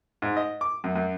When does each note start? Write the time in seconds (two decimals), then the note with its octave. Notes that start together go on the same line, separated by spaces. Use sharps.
0.22 G#2
0.36 D#5
0.61 D6
0.84 F#2
0.96 F#2